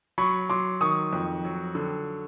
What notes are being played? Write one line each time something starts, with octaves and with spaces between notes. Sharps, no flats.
F#3 B5 C#6
F#3 C6 D6
D#3 C#6 D#6
F2
F#3
D3